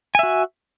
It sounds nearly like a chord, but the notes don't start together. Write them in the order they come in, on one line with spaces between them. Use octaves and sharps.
G#5 E5 F#4